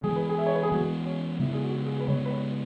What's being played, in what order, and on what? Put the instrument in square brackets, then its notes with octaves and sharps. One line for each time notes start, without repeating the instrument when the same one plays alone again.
[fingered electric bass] E3 G#3 B3 [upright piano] G#4
[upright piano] B4
G#4
E5
C#5
B4
G#4
[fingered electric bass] E3 G#3 B3 [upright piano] F#4
[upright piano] C#4
[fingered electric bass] C#3 G#3 B3 [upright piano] E4
[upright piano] G#4
F#4
G#4
B4
[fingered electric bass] C#3 G#3 B3 [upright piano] C#5
[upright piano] B4
C#5